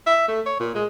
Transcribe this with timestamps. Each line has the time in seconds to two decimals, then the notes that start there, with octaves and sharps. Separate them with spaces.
0.07 E5
0.28 A3
0.46 C#5
0.60 A#2
0.75 G#3